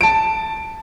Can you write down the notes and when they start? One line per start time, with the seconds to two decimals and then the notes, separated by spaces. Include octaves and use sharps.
0.01 A5 D7